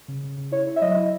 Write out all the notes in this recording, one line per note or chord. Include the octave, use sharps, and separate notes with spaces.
C#3
C#3
C#3
E4 C#5
E4
E5
F#3 D#5
E4